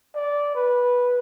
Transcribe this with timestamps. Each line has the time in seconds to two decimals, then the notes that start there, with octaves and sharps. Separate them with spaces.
0.15 D5
0.55 B4